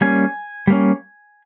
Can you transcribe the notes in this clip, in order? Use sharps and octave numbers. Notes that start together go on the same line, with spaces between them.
G3 A#3 C#4 G#5
G3 A#3 C#4